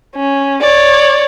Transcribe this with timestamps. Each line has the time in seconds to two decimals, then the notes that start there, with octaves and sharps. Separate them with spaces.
0.16 C#4
0.61 C#5 D5